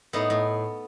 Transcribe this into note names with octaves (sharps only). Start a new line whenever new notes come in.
A2 B3 D#4
A2